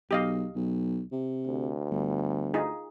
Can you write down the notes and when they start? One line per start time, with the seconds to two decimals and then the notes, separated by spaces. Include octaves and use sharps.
0.11 B1 G4 D#5 F5
0.55 B1
1.12 C3
1.47 D2
1.90 G1
2.54 D#4 F4 G#4